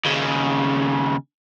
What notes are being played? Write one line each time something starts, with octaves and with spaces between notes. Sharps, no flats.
D#2 C#3